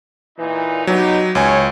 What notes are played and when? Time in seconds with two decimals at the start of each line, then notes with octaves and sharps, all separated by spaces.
0.38 A#2 E3 D#4
0.87 F#3 B3 D#4 G4
1.35 C#2 C#5 G#5